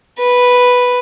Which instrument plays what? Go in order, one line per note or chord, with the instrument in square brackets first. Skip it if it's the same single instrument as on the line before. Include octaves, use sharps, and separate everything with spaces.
[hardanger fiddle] B4